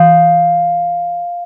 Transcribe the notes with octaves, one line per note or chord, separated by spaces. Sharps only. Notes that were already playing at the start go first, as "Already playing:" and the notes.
Already playing: E3 F5